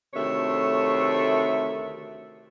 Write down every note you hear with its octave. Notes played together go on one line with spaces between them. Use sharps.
D2 C3 D#3 A3 C#5 E5